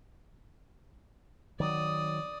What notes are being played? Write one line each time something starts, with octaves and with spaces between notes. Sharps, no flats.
D#3 F#3 D5 D#6